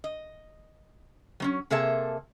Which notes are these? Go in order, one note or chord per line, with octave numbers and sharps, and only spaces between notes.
D#5
F#3 C4 C#4
C3 A#3 G#4 A4 E5 A5